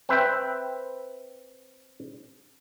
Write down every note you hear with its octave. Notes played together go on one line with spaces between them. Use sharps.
C4 B4 E5 G5